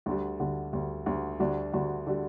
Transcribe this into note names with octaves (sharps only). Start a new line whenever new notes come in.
D2 D3 G3
D2 D3 G3
D2 D3 G3
D2 D3 G3
D2 D3 G3 D4 F#4
D2 D3 G3 D4 F#4
D3 G3 D4 F#4